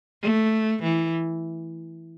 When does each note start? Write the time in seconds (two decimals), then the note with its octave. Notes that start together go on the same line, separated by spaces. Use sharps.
0.22 A3
0.82 E3